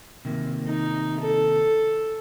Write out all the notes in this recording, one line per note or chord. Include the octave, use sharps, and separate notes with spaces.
C3 D#3 A#3
D#4
A4